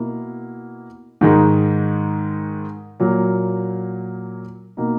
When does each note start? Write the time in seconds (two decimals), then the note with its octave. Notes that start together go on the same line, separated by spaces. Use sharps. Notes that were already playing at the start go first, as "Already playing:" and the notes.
Already playing: B2 A#3 E4
1.21 G#2 D#3 G#3
3.00 A#2 F#3 A#3
4.77 B2 A#3 D#4